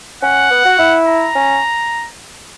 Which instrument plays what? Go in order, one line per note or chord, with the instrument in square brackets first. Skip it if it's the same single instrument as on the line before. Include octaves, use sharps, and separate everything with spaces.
[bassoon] C#4 [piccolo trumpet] F#5
[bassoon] B3
F#4
E4
[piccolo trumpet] A#5
[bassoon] C#4